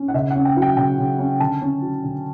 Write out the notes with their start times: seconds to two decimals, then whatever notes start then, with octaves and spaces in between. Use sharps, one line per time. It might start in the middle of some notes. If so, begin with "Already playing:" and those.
Already playing: C#4
0.08 F#5
0.14 C#3 E5
0.30 C#4 F#5
0.45 G5
0.57 F#3
0.62 G5
0.76 C#3 G5
0.99 C#3
1.18 C#4
1.39 D3 A5
1.61 C#4
1.82 F#3
2.04 D3